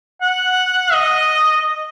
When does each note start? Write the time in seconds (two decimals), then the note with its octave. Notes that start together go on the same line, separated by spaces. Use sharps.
0.22 F#5
0.93 D#5